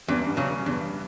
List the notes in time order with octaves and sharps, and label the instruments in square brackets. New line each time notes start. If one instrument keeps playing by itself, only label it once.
[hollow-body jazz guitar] E2 [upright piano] G2
[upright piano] F#2
G2
[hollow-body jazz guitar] C#3 F#3
[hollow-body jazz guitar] E2 [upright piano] G2